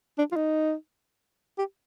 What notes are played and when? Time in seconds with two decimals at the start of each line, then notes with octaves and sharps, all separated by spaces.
0.18 D4
0.32 F4
0.36 D#4
1.58 G4